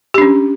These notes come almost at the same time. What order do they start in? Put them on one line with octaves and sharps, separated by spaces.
G4 D4 C#4